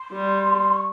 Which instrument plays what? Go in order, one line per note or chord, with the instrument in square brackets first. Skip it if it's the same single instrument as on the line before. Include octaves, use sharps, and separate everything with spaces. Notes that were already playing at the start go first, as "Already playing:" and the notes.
Already playing: [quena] C6
[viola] G3
[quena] C#6